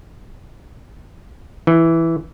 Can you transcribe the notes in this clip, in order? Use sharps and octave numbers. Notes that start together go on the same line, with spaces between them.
E3